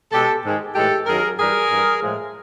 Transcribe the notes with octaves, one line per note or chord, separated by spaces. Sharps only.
B2 G#3 G4 A4
G#2 D#3 G#3
A2 E3 G#3 G4 A4
F#2 D#3 F#3 G#4 A#4
G2 E3 G3 G#4 A#4
G2 E3 G3
A2 F3 G#3